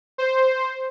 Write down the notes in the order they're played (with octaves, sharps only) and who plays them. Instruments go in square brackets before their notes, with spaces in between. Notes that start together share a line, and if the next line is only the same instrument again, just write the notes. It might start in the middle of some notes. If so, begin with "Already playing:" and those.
[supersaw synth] C5